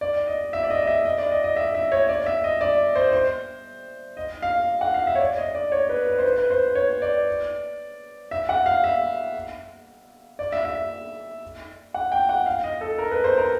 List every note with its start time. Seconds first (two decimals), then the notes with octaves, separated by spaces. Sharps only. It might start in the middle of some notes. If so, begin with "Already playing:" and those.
0.01 D5
0.27 D#5
0.53 E5
0.63 D5
0.70 D#5
0.82 D#5
0.87 E5
1.05 D#5
1.18 D5
1.31 D#5
1.44 D#5
1.56 E5
1.75 E5
1.92 C#5
2.09 D5
2.26 E5
2.44 D#5
2.61 D5
2.96 C5
3.13 C5
4.17 D#5
4.42 F5
4.81 F#5
4.94 F5
5.07 E5
5.15 C#5
5.20 D5
5.38 D#5
5.55 D5
5.72 C#5
5.89 B4
6.07 B4
6.18 C5
6.24 B4
6.38 B4
6.50 C5
6.75 C#5
7.02 D5
8.31 E5
8.49 F#5
8.66 F5
8.84 E5
10.39 D5
10.52 E5
10.65 E5
11.94 F#5
12.12 G5
12.29 F#5
12.46 F5
12.64 D#5
12.81 A4
12.98 A#4
13.11 B4
13.24 C5
13.38 A#4